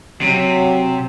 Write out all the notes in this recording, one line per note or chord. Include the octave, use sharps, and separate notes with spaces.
C3 F#3